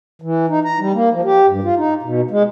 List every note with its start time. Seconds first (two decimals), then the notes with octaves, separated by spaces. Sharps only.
0.22 E3
0.49 D#4
0.65 A#5
0.79 G3
0.94 A#3
1.12 F3
1.24 G4
1.47 G2
1.64 F4
1.76 D#4
2.03 B2
2.31 G#3